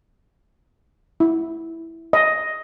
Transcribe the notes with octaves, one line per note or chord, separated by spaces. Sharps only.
E4
D#5